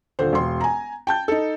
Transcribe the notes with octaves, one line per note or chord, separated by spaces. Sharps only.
D#1 D3 C5
E1 C6
G#5 A#5
G5 A5 G6
D#4 A4